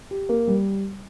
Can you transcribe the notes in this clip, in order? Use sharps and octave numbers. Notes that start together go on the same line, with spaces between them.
G4
A#3
G3